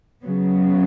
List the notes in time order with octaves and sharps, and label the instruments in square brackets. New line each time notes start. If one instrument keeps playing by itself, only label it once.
[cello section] C#3 F#3 B3